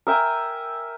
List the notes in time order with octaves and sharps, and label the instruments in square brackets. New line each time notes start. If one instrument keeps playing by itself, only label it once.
[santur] A#4 E5 G5 G#5